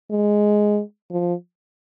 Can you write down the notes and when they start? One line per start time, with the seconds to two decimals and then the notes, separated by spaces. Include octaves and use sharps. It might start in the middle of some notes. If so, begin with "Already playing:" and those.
0.10 G#3
1.11 F3